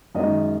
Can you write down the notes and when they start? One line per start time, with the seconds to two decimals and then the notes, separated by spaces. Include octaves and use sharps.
0.15 F#2 D#3 G#3 D#5